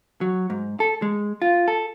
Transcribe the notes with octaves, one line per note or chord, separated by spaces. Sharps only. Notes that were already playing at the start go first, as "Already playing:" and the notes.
F#3
G#2
A4
G#3
F4
A4